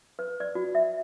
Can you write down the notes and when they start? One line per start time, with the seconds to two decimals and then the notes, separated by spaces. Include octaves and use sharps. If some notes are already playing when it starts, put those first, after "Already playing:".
0.19 B4
0.40 D5
0.55 F#4
0.75 E5